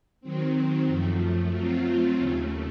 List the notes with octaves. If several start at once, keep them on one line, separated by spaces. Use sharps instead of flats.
D#3 F#3 C4
F#2 F3 A3
F#3 A3 C4 F4
D#2 C#3 A3